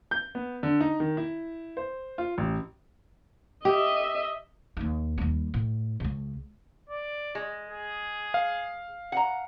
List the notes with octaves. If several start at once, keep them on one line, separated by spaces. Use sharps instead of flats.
G6
B3
D3
D#4
D#3
E4
C5
F4
A1
G4 D#5 E5
D#2 D#4
D#2 G3
A2
C#2 C#3
D5
G#3
G#4
F5
F#5 A#5